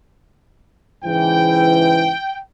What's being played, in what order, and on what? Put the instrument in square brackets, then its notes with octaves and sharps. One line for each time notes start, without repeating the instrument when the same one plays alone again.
[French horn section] G#2 C#3 E3 [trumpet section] G5